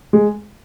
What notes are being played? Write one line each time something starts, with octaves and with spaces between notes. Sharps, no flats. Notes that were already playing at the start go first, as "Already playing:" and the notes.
G#3